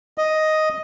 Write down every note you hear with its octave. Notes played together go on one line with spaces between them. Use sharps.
D#5